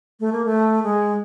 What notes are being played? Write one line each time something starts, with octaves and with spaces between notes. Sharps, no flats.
A3
A#3
A3
G#3